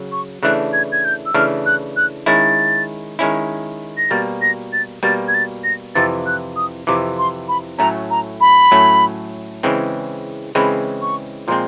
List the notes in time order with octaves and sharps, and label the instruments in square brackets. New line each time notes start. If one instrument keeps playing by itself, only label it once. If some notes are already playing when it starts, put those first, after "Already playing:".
Already playing: [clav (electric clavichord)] C#3 F#3
[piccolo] C#6
[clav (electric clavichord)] C#3 E3 A3 D4 [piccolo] F#6
[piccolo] G#6
G#6
G6
E6
[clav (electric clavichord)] C#3 E3 A3 D4 [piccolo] F6
[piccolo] F#6
F#6
[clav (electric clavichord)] D#3 G#3 C#4 E4 [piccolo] A6
[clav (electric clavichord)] D#3 G#3 C#4 E4
[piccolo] A#6
[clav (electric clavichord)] B2 G3 A#3 [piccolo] A6
[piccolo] A#6
A6
[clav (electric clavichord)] B2 G3 A#3 [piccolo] A6
[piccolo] G#6
A6
A#6
[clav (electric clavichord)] F2 C3 E3 [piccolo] A6
[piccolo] F#6
D#6
[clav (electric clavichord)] F2 C3 E3 [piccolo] D6
[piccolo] C6
B5
[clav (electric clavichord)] A2 F#3 A3 C#4 [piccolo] A#5
[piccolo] A#5
B5
[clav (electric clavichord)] A2 F#3 A3 C#4
C#3 E3 G#3 C4
[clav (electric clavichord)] C#3 E3 G#3 C4 [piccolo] B5
[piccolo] C#6
[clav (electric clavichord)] A#2 F3 G#3 C4 [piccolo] C6